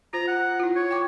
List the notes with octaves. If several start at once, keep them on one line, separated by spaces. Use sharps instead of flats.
F4 C5 A#5
F#5
E4 F4
C#5
G5 D6